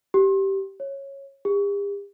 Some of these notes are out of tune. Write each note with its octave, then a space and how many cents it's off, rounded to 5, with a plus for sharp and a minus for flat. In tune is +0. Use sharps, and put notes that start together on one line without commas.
G4 -15
C#5 -10
G4 +45